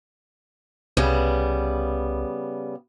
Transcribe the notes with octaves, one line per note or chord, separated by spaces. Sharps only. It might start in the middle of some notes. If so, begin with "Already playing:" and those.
C2 C#3 G3 B3